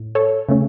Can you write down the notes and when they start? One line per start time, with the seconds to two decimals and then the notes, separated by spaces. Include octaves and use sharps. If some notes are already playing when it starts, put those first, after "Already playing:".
Already playing: A2
0.15 A4 C#5
0.49 C#3 A3 C#4